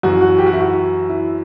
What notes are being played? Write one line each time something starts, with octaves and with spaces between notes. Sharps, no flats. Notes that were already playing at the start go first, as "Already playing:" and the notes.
F#2 E3 F#4
F#4
G4
F#4
E4
F#4
E4